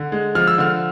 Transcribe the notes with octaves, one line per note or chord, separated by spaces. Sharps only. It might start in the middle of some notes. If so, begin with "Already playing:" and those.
Already playing: D3
G#3
F3 F6
E6
D3 F6